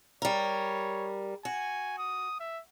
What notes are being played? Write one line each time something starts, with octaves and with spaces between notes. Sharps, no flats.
G3 A#4 C#5
F#4 G#5
D#6
E5